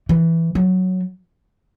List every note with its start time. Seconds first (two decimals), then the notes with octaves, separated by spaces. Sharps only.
0.09 E3
0.55 F#3